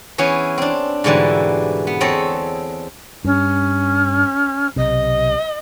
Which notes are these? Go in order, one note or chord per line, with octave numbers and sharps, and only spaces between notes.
E3 B3 C#4 G#4
C4 D4
G#2 B2 D3 E3 G3
B3
E2 C4 A4 C#5 D#5 E5
G2 C#4
B1 C3 D#5